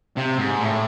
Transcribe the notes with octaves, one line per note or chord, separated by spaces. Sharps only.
C3
G#2
A2